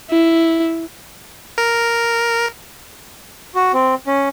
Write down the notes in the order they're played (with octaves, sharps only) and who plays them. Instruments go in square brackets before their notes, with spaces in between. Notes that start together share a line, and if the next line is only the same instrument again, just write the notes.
[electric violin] E4
[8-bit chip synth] A#4
[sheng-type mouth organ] F#4
C4
C#4